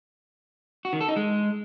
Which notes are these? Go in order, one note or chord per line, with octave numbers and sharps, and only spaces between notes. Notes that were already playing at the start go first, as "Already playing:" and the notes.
F#4
D#3
A4
D#4
G#3